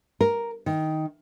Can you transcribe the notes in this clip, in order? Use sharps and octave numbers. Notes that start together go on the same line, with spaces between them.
A#4
D#3